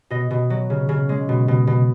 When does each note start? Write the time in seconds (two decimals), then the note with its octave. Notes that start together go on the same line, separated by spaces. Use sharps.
0.10 B2 D#5
0.30 B2
0.50 F#3
0.70 C#3
0.89 C#3
1.09 G#3
1.29 B2
1.48 B2
1.67 B2